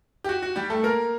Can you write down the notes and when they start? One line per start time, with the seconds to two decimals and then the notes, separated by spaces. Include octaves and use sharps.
0.24 G4
0.29 F#4
0.43 F#4
0.56 G3 G4
0.70 A3 A4
0.83 A#3 A#4